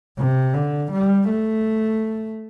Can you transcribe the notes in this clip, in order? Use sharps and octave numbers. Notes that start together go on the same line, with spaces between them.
C3
D3
G3
A3